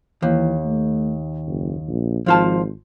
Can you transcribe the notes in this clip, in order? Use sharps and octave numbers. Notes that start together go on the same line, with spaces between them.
D#2 E3
A3
F#1
A#1
G#1 F3 F4 A5